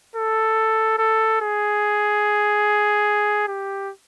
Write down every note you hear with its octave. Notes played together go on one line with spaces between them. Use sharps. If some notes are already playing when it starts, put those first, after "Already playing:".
A4
A4
G#4
G4